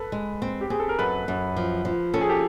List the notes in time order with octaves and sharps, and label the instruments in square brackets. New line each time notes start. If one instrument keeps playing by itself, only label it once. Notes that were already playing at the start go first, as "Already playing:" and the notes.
Already playing: [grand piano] A4 B4
[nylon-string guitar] G#3
C4
[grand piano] G4
[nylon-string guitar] C4 [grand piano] G#4
[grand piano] A4
A#4
[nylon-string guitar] F#2 [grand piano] A4 B4
[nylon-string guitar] F#2
F3
F3
[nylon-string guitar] C#4 [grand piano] A4
[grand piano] G#4
G4 A4